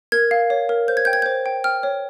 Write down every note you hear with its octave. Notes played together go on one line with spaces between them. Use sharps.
A#4 G#6
F5
C#5
A#4
C5 G6
G#6
G5 G6
G#6
C5 G6
G5
G5 F6
C#5